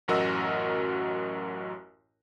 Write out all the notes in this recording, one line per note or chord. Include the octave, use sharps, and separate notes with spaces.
A1 F#2 F#4 A#4 D#5 E6